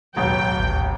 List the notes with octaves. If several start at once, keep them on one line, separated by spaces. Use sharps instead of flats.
E1 A1 D#2 F#3 G5
G#1 D2